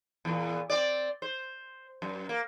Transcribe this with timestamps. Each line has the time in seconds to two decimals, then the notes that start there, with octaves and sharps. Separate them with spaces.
0.25 E2 A#2
0.70 C4 D5
1.22 C5
2.02 F#2
2.29 A#3